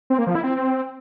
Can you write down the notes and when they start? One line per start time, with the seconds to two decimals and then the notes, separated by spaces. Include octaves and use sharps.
0.10 C4
0.18 A#3
0.27 F3
0.35 E4
0.44 C4